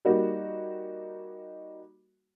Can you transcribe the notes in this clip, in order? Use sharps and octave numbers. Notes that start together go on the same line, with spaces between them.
G3 A#3 D#4 F#4